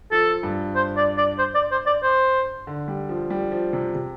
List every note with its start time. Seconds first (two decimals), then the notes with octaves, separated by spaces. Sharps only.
0.12 F3 A4
0.43 G2
0.75 C5
0.97 D5
1.18 D5
1.38 C5
1.55 D5
1.71 C5
1.87 D5
2.03 C5
2.67 D3
2.88 G3
3.09 F3
3.30 G3
3.52 F3
3.73 C3
3.95 C3